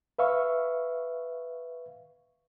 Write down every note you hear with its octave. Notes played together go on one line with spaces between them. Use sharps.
B4 E5 F5 C#6